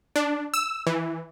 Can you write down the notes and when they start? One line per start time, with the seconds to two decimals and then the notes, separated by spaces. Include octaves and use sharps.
0.16 D4
0.54 E6
0.87 E3